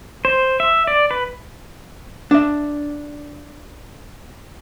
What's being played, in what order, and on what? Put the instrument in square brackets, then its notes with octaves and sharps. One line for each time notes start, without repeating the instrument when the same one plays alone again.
[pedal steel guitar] C5
E5
D5
B4
[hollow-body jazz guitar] D4 E5